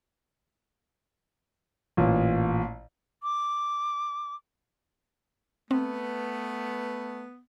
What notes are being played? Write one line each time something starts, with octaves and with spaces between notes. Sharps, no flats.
A1 A#2
D6
A3 B3 C4